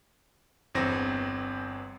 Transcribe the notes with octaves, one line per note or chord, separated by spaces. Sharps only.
G1 E2 C4 A#6